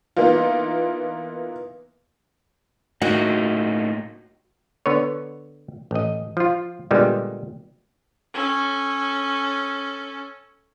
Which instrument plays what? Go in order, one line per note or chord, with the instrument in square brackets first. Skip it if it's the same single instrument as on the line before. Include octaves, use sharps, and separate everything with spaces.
[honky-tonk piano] E3 A#3 B3 D#4 F4
[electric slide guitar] A2 A#3 D#4 [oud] F#4
[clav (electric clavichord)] D3 B3 B4 C#5
A1 D#5
F3 F4
A#2 D3 G3 G#3 B3
[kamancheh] C#4 A4